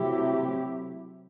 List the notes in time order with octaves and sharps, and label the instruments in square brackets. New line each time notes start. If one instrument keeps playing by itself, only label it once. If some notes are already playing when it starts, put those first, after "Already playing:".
Already playing: [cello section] C3 F#3 A3 E4 G4